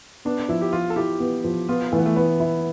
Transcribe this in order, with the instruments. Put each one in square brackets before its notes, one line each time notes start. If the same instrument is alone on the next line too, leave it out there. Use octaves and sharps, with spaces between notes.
[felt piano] B3 [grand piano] D4
[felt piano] F3 [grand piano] E4
[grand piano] G4
[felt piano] F3 [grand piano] F4
[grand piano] A4
[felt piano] E4 [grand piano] G4
[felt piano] B3
F3
[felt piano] B3 [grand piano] F4
[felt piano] E3 [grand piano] A3
[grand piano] B3
A3
[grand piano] B3 [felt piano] B4
[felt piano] E4